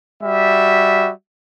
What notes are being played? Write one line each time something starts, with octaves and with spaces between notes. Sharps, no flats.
G3 F#4 E5